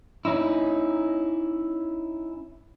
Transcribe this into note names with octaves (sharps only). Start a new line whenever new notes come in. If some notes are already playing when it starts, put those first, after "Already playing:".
C#4 D#4 E4